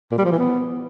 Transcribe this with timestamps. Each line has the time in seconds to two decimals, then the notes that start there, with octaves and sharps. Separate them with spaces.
0.11 A#2
0.18 G3
0.25 F3
0.32 E3
0.39 B3